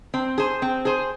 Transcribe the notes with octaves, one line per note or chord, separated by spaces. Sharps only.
C4
G#4 C5
C4
G#4 C5